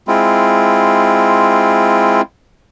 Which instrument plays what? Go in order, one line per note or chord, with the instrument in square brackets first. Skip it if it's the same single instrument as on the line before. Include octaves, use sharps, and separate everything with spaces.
[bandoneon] G#3 C4 E4 F4